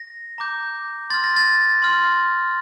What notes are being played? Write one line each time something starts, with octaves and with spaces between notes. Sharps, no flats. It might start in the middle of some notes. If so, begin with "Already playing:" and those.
Already playing: A#6
A#5 D6 G6
C6 F6 A6
A#6
A6
C6 F6